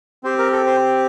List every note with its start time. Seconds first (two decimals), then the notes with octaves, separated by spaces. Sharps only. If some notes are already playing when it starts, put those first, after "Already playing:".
0.24 C4 G4 C5
0.38 A#4
0.52 A4
0.66 C5